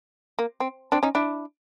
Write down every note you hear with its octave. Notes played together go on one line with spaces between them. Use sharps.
A#3
C4
C4 D4
C#4 D#4
D4 E4